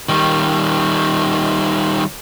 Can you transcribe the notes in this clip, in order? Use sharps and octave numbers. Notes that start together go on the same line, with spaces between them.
D#3 G3